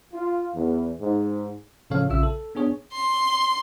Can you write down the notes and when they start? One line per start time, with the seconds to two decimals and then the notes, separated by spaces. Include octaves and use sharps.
0.13 F4
0.54 E2
0.99 G#2
1.90 A2 C#3 F3 A4 C#5 F5
2.09 A#1 C#3 F4 E5 E6
2.23 A4
2.55 B3 D4 G#4 C#5
2.92 C6